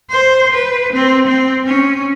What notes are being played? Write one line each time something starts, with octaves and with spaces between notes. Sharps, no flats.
C5
B4
C4
C4
C#4